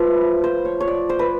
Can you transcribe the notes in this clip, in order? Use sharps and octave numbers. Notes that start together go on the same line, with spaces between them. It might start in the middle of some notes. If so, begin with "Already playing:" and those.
Already playing: F3 A3 F4 B4
C5
C#5
C#5
D5
C5
B4